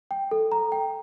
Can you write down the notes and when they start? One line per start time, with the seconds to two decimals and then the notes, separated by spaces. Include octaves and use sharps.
0.11 G5
0.31 A4
0.52 A#5
0.72 G5